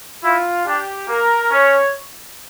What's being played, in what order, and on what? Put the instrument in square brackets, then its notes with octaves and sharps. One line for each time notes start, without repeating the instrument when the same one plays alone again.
[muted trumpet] E4 [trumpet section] F4
[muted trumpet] D4 [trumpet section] G4
[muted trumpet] A#3 [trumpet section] A#4
[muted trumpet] C#4 [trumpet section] C#5